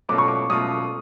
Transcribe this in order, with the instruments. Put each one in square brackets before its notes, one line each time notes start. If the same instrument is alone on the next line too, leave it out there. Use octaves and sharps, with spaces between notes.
[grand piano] B2 F#3 A3 C#4 F4 [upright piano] D6
[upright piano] C#6
D6
[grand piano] B2 F#3 A3 C#4 F4 [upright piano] D#6